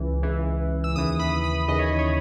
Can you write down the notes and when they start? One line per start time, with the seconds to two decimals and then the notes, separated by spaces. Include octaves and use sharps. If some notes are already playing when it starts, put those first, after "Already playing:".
Already playing: C#2 C#3 E3
0.23 C#2 C#3 E3
0.84 E6
0.95 D#2 C#3 E3 D#6
1.19 B5
1.44 B5
1.68 D#2 C#3 E3 D#5
1.79 C#5
1.99 C#5